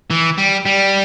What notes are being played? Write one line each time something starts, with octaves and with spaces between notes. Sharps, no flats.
E3
G3
G3